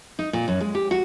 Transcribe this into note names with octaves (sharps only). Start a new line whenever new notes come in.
D#4
A#2
F#2
G#3
G4
F#4